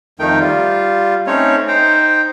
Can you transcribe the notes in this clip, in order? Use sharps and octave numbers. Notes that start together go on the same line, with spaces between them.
F2 D#3 A3 D#4 G5
G3 F4
A3 C4 C#4 D#4 C#5
D#4 C5 G5